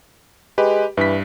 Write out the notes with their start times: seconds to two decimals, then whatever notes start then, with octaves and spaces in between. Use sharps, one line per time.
0.58 G#3 G4 B4
0.97 G2 E3 B6